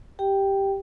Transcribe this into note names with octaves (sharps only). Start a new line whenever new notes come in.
G4 G5